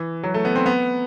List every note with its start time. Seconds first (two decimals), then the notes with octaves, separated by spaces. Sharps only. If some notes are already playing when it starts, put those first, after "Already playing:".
Already playing: E3
0.23 F#3
0.34 A3
0.45 B3
0.56 C4
0.66 B3